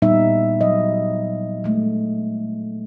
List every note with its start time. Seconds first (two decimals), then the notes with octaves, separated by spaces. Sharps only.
0.02 A#2 G3 B3 D#4 E5
0.61 F#3 D#5
1.64 G#3 A3